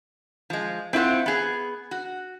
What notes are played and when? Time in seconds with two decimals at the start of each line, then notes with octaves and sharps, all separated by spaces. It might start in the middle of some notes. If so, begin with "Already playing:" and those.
0.50 F3 G#3
0.93 C4 E4 F4 B4 F#5
1.26 B3 G#4
1.91 F#4